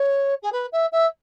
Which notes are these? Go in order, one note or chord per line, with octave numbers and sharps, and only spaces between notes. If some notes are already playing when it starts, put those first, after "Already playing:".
Already playing: C#5
G#4
B4
E5
E5